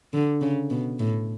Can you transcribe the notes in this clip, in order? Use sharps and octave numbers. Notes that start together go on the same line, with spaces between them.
D3
C#3
B2
A2